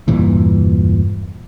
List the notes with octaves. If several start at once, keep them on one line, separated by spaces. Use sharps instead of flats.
E1 G2 A#2 E3